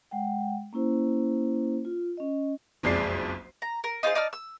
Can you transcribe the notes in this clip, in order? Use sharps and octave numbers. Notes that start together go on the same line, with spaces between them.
G#3 F#5 G5
A#3 C#4 E4 C5
F4
C#4 D#5
F#1 B1 F2 G#3 D5 C7
A#5
A#4
D#4 F4 G#4 C5
D#4 D5 A5 F6
E6